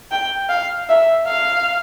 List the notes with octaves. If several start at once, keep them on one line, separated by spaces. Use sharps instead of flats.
G5
F5
E5
F5